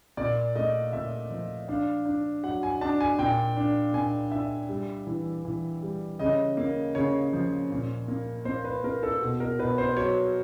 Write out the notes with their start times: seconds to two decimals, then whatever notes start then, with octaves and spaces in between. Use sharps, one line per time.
0.17 A#2 D5
0.55 A3 D#5
0.93 A#2 E5
1.31 F3
1.68 D4 F5
2.05 D4
2.43 F#3 F#5
2.63 G#5
2.81 D4 A5
3.01 G#5
3.19 A#2 G5
3.57 D4
3.94 A#2 G#5
4.32 D4 E5
4.69 G3
5.07 E3
5.45 E3
5.82 G3
6.19 C#3 D#5
6.57 A#3
6.95 C#3 C#5
7.33 F3
7.70 A#2
8.08 A#3
8.45 A#3 C5
8.64 B4
8.84 A#3 A#4
9.03 A4
9.21 B2
9.40 A#4
9.59 B2 B4
9.78 C5
9.97 F#3 C#5